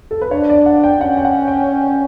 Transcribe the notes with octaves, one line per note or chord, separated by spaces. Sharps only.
A4
B4
D4 C#5
D5
F#5
G5
C#4 F#5
G5
F#5
G5